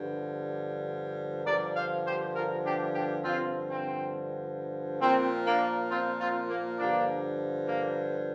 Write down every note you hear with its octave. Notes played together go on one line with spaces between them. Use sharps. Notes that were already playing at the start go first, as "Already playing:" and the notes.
Already playing: G2 D3 F3
G2 D3 F3 A#4 D5
C5 F5
G4 C5
F4 A#4
D4 G4
D4 G4
G2 D3 F3 C4 F4
C4
A#2 F3 C4
A#3 D4
C4 F4
C4 F4
A#3
G2 D3 F3 A#3 D4
A#3